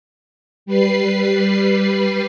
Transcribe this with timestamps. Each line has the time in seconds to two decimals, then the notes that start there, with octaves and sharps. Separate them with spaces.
0.66 G3 B4 C7